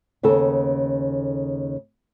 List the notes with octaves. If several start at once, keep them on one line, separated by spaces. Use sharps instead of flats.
D#2 C#3 B3 A4